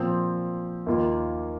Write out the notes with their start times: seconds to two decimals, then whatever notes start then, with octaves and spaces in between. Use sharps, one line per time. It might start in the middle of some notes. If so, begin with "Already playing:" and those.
Already playing: A#2 F3 C4
0.86 D#2 D#3 A#3 F4